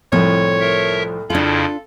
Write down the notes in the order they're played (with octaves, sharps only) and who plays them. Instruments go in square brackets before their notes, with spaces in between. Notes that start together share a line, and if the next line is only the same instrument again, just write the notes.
[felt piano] C2 A2 [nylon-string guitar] F3 [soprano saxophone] C#5
[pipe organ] A#4 E5
[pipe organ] F2 C#3 E4 [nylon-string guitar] D4 F4 [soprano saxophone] A4